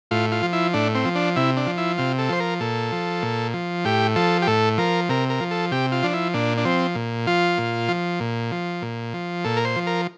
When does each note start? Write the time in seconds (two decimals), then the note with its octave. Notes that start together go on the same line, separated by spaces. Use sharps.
0.11 A2 F4
0.32 F4
0.43 F3
0.53 E4
0.73 A2 D4
0.95 C4
1.05 F3
1.15 D4
1.36 C3 E4
1.57 D4
1.67 F3
1.78 E4
1.98 C3 F4
2.19 A4
2.29 F3 C5
2.40 A#4
2.60 A#2 A4
2.92 F3
3.23 A#2
3.54 F3
3.85 A2 G4
4.16 F3 A4
4.42 G4
4.47 A2 A4
4.78 F3 A#4
5.09 C3 A#4
5.30 A#4
5.40 F3
5.51 A4
5.72 C3 G4
5.92 F4
6.03 F3 D4
6.13 E4
6.34 A#2 D4
6.58 D4
6.65 F3 C4
6.95 A#2
7.27 F3 F4
7.58 A#2
7.89 F3
8.20 A#2
8.52 F3
8.82 A#2
9.14 F3
9.44 A#2 A4
9.57 A#4
9.65 C5
9.76 F3
9.87 A#4